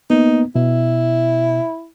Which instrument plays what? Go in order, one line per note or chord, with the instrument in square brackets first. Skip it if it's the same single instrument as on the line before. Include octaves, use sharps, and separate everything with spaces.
[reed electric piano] A#3 B3 [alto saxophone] D#4
[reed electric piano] B2 [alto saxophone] E4